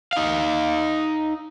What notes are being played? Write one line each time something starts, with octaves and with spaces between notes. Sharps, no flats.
D#4 F5